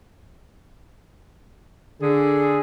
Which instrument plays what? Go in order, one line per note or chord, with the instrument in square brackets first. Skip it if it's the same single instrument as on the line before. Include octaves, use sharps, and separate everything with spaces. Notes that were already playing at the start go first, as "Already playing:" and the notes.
[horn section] D3 G#4